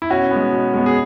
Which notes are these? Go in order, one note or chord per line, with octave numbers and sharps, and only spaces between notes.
E4
B2 C#4 F#4
G#3 B3
B2
G#3 B3
G#4